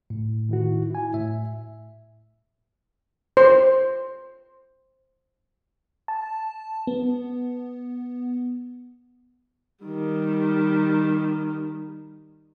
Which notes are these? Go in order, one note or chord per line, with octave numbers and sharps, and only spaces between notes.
A2
D#3 E4 F#4
E4 G#5
A2 E5
C5
A5
B3
D#3 G3